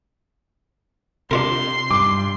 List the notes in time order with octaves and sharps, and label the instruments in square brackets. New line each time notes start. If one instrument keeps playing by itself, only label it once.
[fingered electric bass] C3 [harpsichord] D4 F4 A#4 [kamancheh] C6
[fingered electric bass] G2 [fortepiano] D6